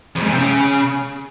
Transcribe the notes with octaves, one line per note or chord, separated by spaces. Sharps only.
F2
G#2
C3
C#3